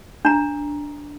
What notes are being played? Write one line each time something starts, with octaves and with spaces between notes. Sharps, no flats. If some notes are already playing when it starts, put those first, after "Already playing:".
D4 A#5